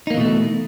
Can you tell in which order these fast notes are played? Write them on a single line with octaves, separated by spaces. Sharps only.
D#4 A#3 E3 B2 A3